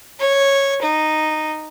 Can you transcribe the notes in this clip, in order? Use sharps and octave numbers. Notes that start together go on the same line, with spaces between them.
C#5
D#4